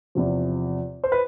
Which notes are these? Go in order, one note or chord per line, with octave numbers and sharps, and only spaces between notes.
E2 C3 F3
C5
B4